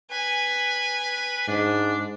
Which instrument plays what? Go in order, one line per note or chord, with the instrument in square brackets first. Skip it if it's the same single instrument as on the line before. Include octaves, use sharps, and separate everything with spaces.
[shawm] B4 [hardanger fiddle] G#5
[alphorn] G#2 [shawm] D4